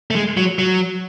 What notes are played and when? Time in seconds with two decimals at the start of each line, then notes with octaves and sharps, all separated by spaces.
0.11 A3
0.15 G#3
0.37 F#3
0.59 F#3